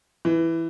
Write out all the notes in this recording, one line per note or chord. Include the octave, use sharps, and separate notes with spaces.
E3